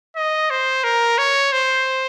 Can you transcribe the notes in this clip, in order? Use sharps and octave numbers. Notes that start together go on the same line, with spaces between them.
D#5
C5
A#4
C#5
C5